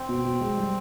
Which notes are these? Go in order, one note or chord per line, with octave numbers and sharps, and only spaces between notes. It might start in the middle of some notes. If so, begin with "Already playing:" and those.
Already playing: C4
B2
B2
G#3
G3